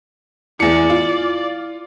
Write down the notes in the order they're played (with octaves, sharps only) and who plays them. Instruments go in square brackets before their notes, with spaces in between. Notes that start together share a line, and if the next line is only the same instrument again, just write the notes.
[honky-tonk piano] E2 C#7 [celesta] E4 [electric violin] D5
[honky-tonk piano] F4